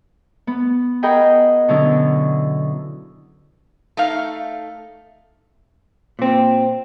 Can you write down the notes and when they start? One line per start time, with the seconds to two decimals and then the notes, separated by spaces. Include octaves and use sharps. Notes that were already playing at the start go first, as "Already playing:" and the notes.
0.47 B3
1.03 G#4 A#4 D#5 F#5 G5 B5
1.68 B2 D3 F#3 B3 C#4 E4
3.97 A3 D#4 F5
6.19 A#2 C4